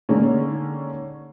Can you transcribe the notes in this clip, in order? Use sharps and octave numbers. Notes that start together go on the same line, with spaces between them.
D3 D#3 G#3 A#3 C#4